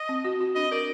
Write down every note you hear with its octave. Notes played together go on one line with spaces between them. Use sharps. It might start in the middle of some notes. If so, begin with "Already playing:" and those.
Already playing: D#5
C4
F#4
F#4
D4 D#5
A#4 D5